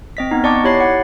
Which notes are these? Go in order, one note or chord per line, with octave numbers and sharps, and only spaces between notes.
C4 D#5 B6
B3 D#4
D5 D#5 F#5 A5 C#6 D6
E4 G4 C#5 B5 A6 C7
F#5